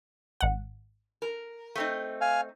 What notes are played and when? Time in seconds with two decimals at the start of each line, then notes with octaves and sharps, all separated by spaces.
0.41 G#1 F#5
1.22 A#4
1.75 A3 C4 D#4
2.21 F5 G#5